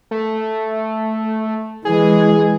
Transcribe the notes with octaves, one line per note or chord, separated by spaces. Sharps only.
A3
E3 G#3 G#4